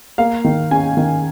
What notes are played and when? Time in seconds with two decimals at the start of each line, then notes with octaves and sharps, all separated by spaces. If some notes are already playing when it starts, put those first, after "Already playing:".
0.18 A#3 F5
0.44 D#3
0.71 C#4 G#5
0.97 D#3